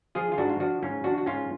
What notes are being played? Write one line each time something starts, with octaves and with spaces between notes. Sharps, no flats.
F3 F4 G#4
F4
G#2 D4 F#4
F4
F3 D4 F#4
G#2 C#4 F4
F3 D4 F#4
F#4
G#2 C#4 F4